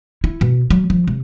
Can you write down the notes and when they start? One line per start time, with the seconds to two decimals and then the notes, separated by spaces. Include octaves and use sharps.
0.24 E4
0.41 B2
0.70 F#3
0.90 F3
1.08 C3